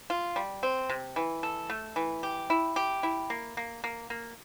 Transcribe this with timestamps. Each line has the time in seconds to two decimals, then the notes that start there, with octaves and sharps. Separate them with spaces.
0.10 F4
0.36 G3
0.63 C4
0.90 C3
1.16 E3
1.43 A4
1.70 A3
1.96 E3
2.23 G4
2.50 E4
2.76 G4
3.03 E4
3.30 A#3
3.57 A#3
3.84 A#3
4.10 A#3